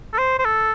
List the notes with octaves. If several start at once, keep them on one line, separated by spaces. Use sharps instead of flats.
A4
C5
C5
A4